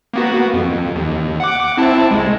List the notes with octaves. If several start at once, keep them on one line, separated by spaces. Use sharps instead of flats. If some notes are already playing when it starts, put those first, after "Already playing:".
A#3 B3 F#4
F2
D#2
F#5 D6
C4 E4 A5
C2 G#3